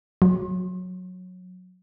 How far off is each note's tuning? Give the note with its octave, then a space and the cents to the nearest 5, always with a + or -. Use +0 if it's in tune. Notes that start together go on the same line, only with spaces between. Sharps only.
F#3 -20